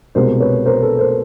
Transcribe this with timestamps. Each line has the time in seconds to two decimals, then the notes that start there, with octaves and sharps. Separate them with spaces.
0.15 C2 B2 G#3 A#4 C5
0.40 B4 C#5
0.66 A#4 C5
0.82 A4 B4
0.99 A#4 C5